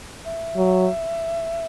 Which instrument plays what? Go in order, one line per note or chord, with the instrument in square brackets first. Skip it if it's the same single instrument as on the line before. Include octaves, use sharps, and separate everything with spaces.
[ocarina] E5
[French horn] F#3